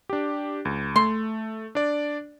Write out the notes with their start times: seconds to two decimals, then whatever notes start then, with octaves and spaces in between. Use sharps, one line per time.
0.09 D4 G4
0.65 C#2
0.96 A3 C6
1.75 D4 D5